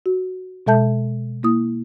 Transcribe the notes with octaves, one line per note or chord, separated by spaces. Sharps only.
F#4
B2 G#3 A4 E5 A5 G6
A#3 E4 D#6